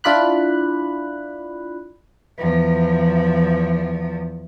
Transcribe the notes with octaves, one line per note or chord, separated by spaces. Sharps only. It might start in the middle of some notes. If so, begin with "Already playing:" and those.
D4 E4 F4 D5 B5 F#6
E2 F3